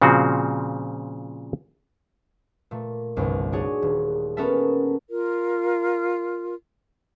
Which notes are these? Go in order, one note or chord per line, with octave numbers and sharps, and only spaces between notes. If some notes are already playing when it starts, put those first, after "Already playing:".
A#2 C#3 F3 C4 F#4 G#4
A#2 A3
G1 C2 G2
D4 D#4 F#4 G#4 C#5 D5
D#1
B3 C#4 A4 A#4 E5 A5
F4 A#4